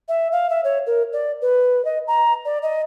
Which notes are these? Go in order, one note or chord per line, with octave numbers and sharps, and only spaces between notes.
E5
F5
E5
C#5
A#4
D5
B4
D#5
A#5
D5
D#5